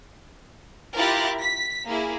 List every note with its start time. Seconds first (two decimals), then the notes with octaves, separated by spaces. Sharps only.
0.97 E4 F4 G4 A#4 F#6 A6
1.42 B6
1.87 A#3 E4 G#4